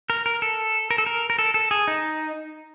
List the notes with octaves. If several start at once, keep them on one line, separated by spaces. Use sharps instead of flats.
A#4
A#4
A4
A#4
A4
A#4
A#4
A4
A4
G#4
D#4